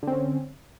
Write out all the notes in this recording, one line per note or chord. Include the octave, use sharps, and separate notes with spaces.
D3 C4 C#4